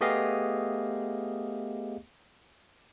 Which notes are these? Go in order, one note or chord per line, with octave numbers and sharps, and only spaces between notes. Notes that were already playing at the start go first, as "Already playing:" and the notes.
A3 B3 G4 G#4 D#5 F5